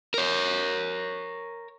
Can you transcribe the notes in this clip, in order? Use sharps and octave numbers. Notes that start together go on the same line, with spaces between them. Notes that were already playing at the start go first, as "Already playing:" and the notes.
A#4 C#5